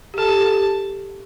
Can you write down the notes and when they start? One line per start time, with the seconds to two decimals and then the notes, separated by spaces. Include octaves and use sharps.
0.14 G4
0.18 A4 A5
0.29 G4
0.41 A4
0.51 G4